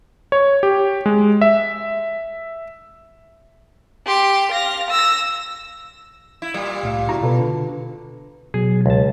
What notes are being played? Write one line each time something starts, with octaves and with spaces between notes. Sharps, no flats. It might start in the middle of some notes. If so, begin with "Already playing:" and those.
C#5
G4
G#3
E5
G4 C6
F5 A#6
E6 A#6
E4
A#2 G3
C2 A2 F5
C#2 E4 F#4 A#5
B2 F4 A4 B4
D3
B2 F#3 G#4
C#2 A5